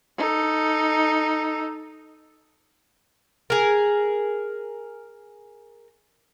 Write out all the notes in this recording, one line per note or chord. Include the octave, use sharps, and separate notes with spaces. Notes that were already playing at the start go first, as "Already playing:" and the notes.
D#4 A4
G#4 A#4